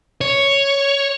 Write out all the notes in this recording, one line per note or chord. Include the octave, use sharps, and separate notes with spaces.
C#5